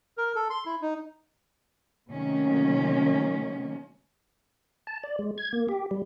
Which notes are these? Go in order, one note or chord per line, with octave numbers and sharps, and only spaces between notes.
A#4
A4
C6
E4
D#4
C3 D#3 F#3 A3 A#3 C#4
A5
D5
G#3
G#6
A#3
G4
G3